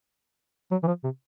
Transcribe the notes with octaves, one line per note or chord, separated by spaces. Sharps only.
F#3
E3
F3
C3